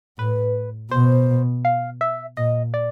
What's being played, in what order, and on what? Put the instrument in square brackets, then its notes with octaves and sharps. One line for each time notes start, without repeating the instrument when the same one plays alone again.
[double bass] A2 [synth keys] B4
[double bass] B2 [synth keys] C5
[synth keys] F5
E5
[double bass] A#2 [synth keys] D#5
[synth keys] D5